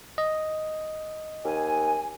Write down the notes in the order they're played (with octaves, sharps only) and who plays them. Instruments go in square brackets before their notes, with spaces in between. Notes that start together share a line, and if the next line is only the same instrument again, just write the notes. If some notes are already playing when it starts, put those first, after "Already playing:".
[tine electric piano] D#5
[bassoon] D#2 [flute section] G#5